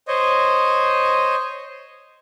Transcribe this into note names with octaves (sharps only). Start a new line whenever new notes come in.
C5 C#5 D#5